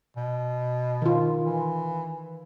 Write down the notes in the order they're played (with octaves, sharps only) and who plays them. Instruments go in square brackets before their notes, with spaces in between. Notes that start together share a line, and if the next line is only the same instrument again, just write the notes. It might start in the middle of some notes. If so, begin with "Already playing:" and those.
[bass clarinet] B2
[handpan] D#3 F4
[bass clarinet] E3